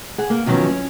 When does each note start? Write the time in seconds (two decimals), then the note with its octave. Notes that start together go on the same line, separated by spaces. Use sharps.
0.18 G#4 F#5
0.30 A#3
0.46 E2 D#3 F3 F#3 B3 C#4
0.69 C#4